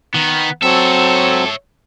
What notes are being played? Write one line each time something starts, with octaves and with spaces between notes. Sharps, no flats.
D#3 B3
F#3 C4 A4 C#5 E5